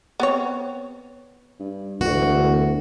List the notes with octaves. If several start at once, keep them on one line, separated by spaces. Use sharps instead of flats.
B3 C4 C#5
G2
E1 D2 F#4